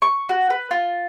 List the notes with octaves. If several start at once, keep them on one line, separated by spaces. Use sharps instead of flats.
C#6
F#4
B4
F4